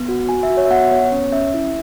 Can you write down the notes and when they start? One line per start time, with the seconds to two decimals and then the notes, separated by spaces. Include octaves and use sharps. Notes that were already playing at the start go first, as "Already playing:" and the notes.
Already playing: B3
0.09 F#4
0.29 F#4 G#5
0.43 E5
0.50 F#4
0.57 C#5
0.65 E5
0.71 B3 F#5
0.91 B3 C#5
1.12 C#4 C#5
1.32 C#4 E5
1.54 E4